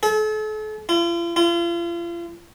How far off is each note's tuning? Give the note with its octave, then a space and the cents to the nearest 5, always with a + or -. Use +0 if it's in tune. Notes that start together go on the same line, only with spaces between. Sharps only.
A4 -40
F4 -45
F4 -40